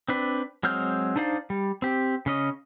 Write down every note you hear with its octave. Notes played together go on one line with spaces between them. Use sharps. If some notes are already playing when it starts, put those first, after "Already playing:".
C4 D4 B4
F#3 G#3 C4 F6 G6
D4 D#4 C5 D5 F5
G3
C4 G4
C#3 C#4 D#5